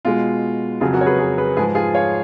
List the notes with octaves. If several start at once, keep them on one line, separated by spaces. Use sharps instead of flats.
B2 G#3 F4
F2 C#3 F#3 F4 G#4
F#4 A#4
C#5
G#4 B4
G#4 B4
G#4 B4
G#2 F3 G#3 G#4 B4
F4 G#4
C#5 F5